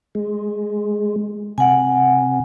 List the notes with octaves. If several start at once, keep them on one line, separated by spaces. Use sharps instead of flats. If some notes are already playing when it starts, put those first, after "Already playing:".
G#3
C3 F#5 G#5